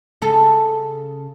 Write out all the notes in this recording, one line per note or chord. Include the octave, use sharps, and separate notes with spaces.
C#3 A4